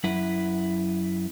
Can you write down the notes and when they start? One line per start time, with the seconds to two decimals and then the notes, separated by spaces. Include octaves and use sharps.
0.04 F#2 E4 B4 F#5